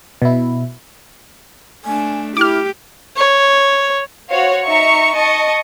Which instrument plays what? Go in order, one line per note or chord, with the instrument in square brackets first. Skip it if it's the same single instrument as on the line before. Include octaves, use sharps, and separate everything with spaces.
[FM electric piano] B2 E4
[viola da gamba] A3 D4 [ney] G#5
[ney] E4 [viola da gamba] G4 [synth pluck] D6 F6
[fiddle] C#5
[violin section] F#4 C5 C#5 F5
D#4 E5 A#5 C#6
D#5 A5 C#6